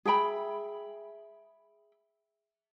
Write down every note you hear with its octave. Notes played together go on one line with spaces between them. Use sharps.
G#4 E5 G5 B5